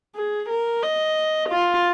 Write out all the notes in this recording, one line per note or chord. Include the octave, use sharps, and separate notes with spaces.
G#4
A#4
D#5
F4